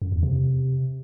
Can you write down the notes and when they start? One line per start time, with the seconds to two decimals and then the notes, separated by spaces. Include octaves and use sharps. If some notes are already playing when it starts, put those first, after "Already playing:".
0.02 F#2
0.12 E2
0.23 C3